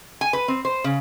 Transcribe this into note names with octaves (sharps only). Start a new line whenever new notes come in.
G#5
B4
C4
C5
C#3